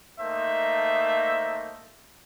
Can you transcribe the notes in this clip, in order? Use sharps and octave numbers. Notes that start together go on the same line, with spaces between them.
A3 A#3 D#4 C5 E5